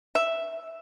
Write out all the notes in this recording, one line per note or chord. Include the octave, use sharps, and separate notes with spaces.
E5